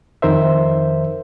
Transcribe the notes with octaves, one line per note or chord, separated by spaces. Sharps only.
F2 D#3 A#4 C5 E5